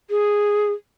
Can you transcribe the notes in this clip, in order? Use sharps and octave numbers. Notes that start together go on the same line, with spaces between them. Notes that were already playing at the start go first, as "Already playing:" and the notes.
G#4